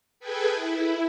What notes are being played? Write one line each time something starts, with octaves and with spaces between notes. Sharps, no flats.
G#4 A4 B4 G5 G#5
E4